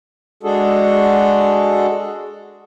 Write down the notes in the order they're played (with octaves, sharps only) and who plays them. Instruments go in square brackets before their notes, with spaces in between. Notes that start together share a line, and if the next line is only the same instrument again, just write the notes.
[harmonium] G#3 D4 F#4 G#4 A4